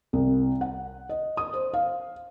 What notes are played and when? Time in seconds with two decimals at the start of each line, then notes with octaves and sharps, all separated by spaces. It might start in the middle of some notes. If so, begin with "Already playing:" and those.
0.13 C2
0.61 F#5
1.09 D#5
1.37 D#6
1.54 C5
1.74 F5